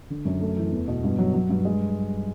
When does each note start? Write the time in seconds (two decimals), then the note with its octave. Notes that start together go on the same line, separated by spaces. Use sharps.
0.10 D3
0.25 F#2
0.41 A3
0.57 E3
0.72 E2
0.88 B2
1.04 G2
1.18 F#3
1.34 F#3
1.49 G2
1.65 G#3